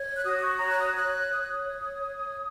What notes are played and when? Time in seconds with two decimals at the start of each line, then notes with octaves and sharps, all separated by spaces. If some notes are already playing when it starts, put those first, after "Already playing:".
Already playing: C#5
0.15 F#6
0.24 F#4 D#6
0.37 D#6
0.41 C#6
0.59 C#5 A#5
0.70 F#6
0.78 D#6
0.96 C#5 F#6
1.32 C#5 D#6
1.43 F#6
1.52 D#6
1.68 C#5
2.03 C#5